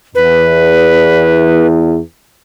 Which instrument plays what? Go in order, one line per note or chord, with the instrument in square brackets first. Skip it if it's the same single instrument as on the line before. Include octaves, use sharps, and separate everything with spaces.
[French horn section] E2 [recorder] B4